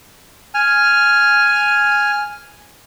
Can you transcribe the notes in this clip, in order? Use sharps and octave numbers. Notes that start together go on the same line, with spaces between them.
G#5 F6